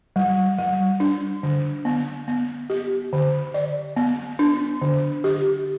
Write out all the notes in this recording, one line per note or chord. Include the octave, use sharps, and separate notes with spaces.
G3
G3
D4
D3
B3
B3
G4
D3
D5
B3
D4
D3
G4